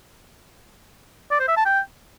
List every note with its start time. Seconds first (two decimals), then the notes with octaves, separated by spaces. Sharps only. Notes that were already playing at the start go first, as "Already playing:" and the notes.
1.31 D5
1.40 C5
1.48 E5
1.57 A5
1.65 G5